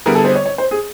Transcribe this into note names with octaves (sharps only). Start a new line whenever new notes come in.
D3 G3 B3 E4 G#4 A#4
A4
C5
C#5
C#5
C5
G#4